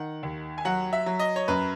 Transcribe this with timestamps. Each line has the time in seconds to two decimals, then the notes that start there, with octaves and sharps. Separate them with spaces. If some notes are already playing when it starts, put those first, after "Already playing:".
Already playing: D#3 F#5
0.23 D#2
0.58 G#5
0.65 F#3 F#5
0.93 E5
1.06 F#3
1.19 D#5
1.36 C#5
1.48 F#2 B4